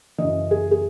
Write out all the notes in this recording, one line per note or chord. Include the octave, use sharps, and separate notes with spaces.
F#2 C#3 E3 D#5
G#4
G#4